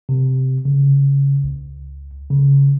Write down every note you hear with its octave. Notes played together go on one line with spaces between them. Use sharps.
C3
C#3
C#2
C#3